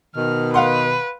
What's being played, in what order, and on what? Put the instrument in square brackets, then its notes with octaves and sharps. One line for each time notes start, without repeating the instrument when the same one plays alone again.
[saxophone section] B2 D#3 [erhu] F6
[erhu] B4 [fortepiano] F5 F#5 C6